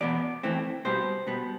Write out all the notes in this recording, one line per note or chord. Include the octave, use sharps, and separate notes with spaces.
E2 B2 B3 D5
F2 E3 A3 C4
B2 G3 B3 C5
B2 G3 B3